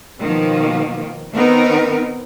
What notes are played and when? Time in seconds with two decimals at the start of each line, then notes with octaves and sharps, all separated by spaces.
0.21 B2 D#3 F3 A#3
1.33 D#3 B3 C4 D#4 A#4